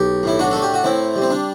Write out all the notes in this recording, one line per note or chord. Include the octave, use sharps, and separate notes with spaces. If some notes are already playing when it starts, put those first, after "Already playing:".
Already playing: B1 G4
A2 E4
D4 F#4
A3 A4
G4
F#4
A2 C4 E4
G3
C4
D4